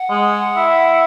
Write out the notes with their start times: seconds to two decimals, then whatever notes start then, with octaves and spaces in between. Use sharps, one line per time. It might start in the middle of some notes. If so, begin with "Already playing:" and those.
Already playing: F#5
0.10 G#3
0.57 E4